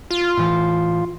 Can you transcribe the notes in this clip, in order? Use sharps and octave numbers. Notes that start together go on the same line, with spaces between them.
F4
A2 E3